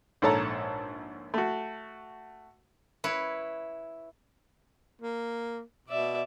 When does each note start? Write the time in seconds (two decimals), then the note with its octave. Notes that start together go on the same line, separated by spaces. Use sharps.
0.22 A#1 G#2 A4 C#5 A5 A#5
1.34 A3 F#4
3.04 E4 B4 C#5
5.02 A#3
5.88 B2 D5 E5